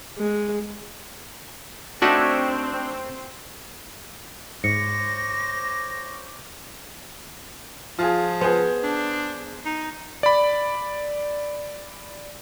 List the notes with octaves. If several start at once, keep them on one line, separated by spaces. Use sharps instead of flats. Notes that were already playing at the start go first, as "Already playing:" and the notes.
G#3
A3 C4 D4 D#4 F#4 C#5 E5 F#5
G#2 C5 C#5 D6 A#6 C#7
F3 F4 G#4
B3 G#4 C5
D4
D#4
D5 B5